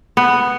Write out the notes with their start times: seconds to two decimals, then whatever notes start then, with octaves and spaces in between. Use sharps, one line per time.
0.17 B3